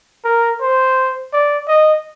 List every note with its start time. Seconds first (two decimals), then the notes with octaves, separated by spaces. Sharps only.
0.25 A#4
0.62 C5
1.33 D5
1.68 D#5